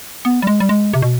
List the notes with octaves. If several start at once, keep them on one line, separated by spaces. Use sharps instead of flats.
B3
G3
G#3
G3
G#3
C3
B2